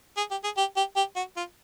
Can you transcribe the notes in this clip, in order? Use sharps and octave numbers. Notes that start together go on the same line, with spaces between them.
G#4
G4
G#4
G4
G4
G4
F#4
F4